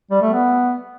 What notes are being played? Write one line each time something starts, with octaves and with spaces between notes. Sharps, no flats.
G3
A3
B3